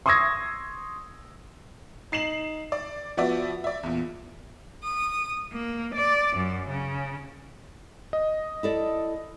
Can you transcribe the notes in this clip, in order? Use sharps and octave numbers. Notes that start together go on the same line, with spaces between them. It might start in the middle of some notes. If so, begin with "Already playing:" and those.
C6 C#6 D#6 E6 G#6 A#6
D#4 C7 E7 F#7
D5
F3 B3 F#4 D5 E5
D5 E5
E2 A#2
D#6
A#3
D5
F#2
C#3
D#5
E4 A4 D5